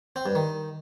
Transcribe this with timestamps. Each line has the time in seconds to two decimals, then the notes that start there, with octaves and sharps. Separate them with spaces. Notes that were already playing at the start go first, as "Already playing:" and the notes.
0.16 C4
0.26 G2
0.35 D#3